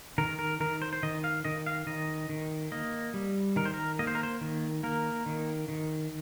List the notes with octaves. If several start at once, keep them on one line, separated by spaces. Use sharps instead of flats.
D#3 A#4
A#4
D#3 A#4
C5
C5
D#3 D#5
F5
D#3 D#5
F5
D#3 D#5
D#3
A#3 D#5
G3
D#3 A#4
C5
A#4
A#3 D#5
C5
A#4
C5
D#3
A#3 A#4
D#3
D#3